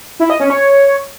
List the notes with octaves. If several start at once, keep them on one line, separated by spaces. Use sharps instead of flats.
E4
D#5
C#4
C#5